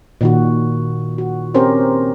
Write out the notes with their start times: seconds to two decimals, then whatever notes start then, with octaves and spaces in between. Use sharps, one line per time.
0.21 A#2 D#3 F#4
1.18 F#4
1.54 C4 C#4 G4 A#4 C5 C#5